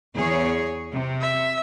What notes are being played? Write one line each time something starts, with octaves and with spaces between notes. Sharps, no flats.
E2 G#4 C#5
C3
E5